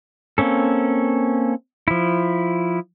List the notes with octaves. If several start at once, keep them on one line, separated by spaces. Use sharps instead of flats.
A#3 C4 C#4 A4
F3 E4